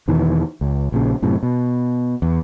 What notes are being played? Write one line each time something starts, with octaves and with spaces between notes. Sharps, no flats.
E2 B2 D#3 E3
C#2
A#1 A#2 C#3
F#2 A2 C3
B2
E2